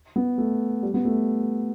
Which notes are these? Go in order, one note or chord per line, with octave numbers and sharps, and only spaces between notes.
B3
A3
G3
B3
A3